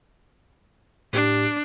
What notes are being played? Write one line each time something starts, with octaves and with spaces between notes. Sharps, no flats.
A2 D4 G4